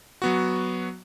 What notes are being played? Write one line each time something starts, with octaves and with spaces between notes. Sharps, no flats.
F#3 B3 F#4